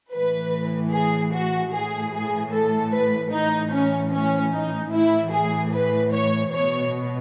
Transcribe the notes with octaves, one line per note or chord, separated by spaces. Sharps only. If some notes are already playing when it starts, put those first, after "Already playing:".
A2 E3 B4
G#4
F#4
A2 E3 G#4
G#4
A4
B4
A2 E3 D#4
C#4
C#4
D#4
A2 E3 E4
G#4
B4
C#5
B2 C#5